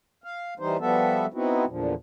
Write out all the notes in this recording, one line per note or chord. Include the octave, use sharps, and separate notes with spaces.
F5
E3 G3 D#4 C5
F3 G3 B3 F#4 A4 E5
B3 C4 D#4 E4 F#4
E2 A#2 D3 F3